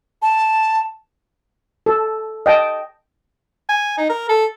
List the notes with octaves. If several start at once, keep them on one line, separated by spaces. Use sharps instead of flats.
A5
A4
D#5 G5 A5
G#5
D#4
A#4
A4